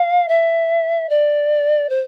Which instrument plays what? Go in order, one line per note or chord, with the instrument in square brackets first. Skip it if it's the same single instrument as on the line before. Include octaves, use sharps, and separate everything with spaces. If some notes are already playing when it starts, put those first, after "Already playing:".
Already playing: [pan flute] F5
E5
D5
C5